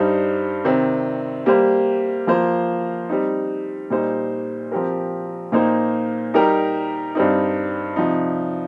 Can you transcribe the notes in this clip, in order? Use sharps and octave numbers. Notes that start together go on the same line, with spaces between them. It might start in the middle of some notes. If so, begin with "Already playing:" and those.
Already playing: G2 G3 D#4 C5
C3 D#3 C4
G3 A#3 G4 C5
F3 A#3 F4 C5
G3 C4 D#4
A#2 G3 D#4 C5
F3 C4 G4 A#4
A#2 A#3 D#4 C5
G3 D#4 G4 A#4
G2 G3 C4 D#4
C3 F3 D#4